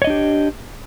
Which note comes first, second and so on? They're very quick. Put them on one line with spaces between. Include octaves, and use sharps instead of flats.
C#5 D#5 D4 G4